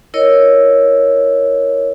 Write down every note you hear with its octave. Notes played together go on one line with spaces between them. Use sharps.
E4 A#4 C#5 D#5